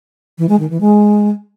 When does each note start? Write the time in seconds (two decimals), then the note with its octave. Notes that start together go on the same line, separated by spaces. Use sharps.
0.38 E3
0.49 G#3
0.59 D#3
0.70 E3
0.81 G#3